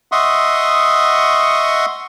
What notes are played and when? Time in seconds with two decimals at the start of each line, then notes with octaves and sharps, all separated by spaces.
0.12 D#5 E5 F#5 C6 C#6 D#6